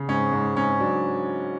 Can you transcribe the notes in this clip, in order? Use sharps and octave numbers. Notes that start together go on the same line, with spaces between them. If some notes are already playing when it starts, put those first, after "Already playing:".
Already playing: C#3
G#2 C#4
G#2
G#2 C#4
F#3 D4